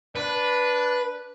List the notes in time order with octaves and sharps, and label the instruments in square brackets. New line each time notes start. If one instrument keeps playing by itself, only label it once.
[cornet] D4 [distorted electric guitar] B4